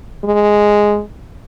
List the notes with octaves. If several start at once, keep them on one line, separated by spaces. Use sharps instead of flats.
G#3